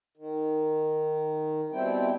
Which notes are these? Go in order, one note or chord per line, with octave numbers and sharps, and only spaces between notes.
D#3
B2 G3 C4 E4 G5